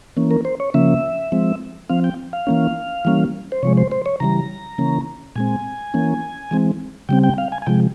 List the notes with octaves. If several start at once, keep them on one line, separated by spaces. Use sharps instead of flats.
E3 A#3 C#4
A#4
C5
C#5
C#3 F3 A#3 C#4 E5
F3 G#3 C4
F3 C4 F5
G5
F5
E3 A#3 C#4
E3 G3 A#3 C#4
C5
C3 F3 G#3 C#5
C5
C5
C#5
C#3 E3 G3 A#5
C#3 E3 A#3 C#4
A#2 G#3 C4 G#5
E3 A#3 C#4
E3 G#3 C4
C#3 G3 C4 G5
G5
F5
G#5
G#5
C3 F3 G#3 G5